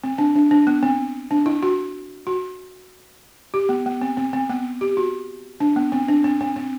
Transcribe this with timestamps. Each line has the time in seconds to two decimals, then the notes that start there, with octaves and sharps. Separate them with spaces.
0.04 C4
0.18 D4
0.35 D4
0.51 D4
0.67 B3
0.83 C4
1.31 D4
1.46 E4
1.63 F#4
2.27 F#4
3.54 G4
3.69 B3
3.86 B3
4.02 C4
4.17 C4
4.33 C4
4.49 B3
4.81 G4
4.97 F#4
5.60 D4
5.76 B3
5.92 C4
6.08 D4
6.24 C4
6.41 C4
6.56 C4